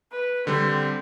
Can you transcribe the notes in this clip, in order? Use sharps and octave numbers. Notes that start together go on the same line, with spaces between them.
B4
D3 G3 C4